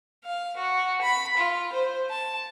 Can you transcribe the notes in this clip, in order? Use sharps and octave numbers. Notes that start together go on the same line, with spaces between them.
F5
F#4
B5
F4
C5
A5